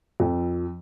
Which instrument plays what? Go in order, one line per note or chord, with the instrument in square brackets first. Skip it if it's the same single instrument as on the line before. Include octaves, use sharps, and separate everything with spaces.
[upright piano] F2